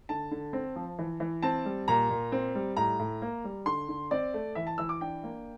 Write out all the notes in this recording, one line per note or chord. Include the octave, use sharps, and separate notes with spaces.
D3 A5
D3
C4
F3
E3
E3
C4 A5
G3
A#2 A#5
A#2
C4
G3
A2 A#5
A2
A#3
G3
D3 C6
D3
C4 D5
A3
E3 E5
A5
E3 E6
D6
D4 G5
A#3